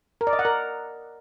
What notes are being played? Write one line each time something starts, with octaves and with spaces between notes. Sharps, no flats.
A#4
D5
D#5
F#5
A#4